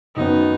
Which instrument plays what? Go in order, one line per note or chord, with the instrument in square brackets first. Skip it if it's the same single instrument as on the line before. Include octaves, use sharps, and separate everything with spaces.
[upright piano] F#2 D#3 B3 [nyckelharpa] D#4